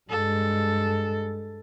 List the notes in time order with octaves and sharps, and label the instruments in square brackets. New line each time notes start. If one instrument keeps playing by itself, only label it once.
[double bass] G2 G#3 [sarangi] A4